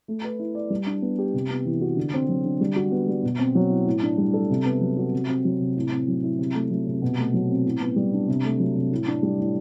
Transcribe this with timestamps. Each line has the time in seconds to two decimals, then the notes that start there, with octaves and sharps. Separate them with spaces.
0.08 A3
0.24 B4
0.39 E4
0.55 D5
0.70 G3
0.87 D4
1.02 B3
1.19 G4
1.34 C3
1.50 B3
1.65 E3
1.81 F#4
1.97 D3
2.13 C4
2.29 F#3
2.45 D3
2.61 G3
2.76 F#4
2.91 B3
3.08 G3
3.23 B2
3.39 C4
3.55 F#3
3.70 E4
3.86 A2
4.03 D4
4.18 G3
4.34 A4
4.50 C3
4.65 B3
4.81 F#3
4.97 F#4
5.13 C3
5.28 C4
5.45 F#3
5.60 C3
5.76 A2
5.91 C4
6.08 F#3
6.24 E4
6.39 C3
6.55 A3
6.70 F#3
6.87 C3
7.02 B2
7.18 A3
7.34 F#3
7.50 C4
7.65 A2
7.81 B3
7.96 G3
8.13 D4
8.28 C3
8.45 A3
8.59 F#3
8.76 C3
8.92 A2
9.08 D4
9.23 G3
9.39 A2